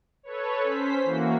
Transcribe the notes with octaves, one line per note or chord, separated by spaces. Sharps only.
A4 B4 C#5
C#4 C5 B6
E3 A#3 F#4